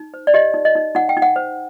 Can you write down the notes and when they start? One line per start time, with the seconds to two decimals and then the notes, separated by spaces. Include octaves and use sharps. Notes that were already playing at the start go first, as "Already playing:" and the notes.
Already playing: D#4
0.14 C5
0.27 D5
0.34 G4 D#5
0.54 D#4
0.65 D#5
0.75 D#4
0.95 D#4 F#5
1.09 G5
1.17 D#4
1.22 F#5
1.36 C5